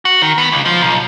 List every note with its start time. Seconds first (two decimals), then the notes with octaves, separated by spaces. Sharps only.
0.05 F#4
0.22 D#3
0.38 B3
0.52 C#2
0.65 F3
0.81 B1